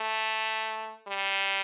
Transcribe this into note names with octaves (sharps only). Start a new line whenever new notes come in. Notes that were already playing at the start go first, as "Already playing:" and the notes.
Already playing: A3
G3